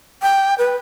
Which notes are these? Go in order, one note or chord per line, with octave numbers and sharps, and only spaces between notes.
G5
B4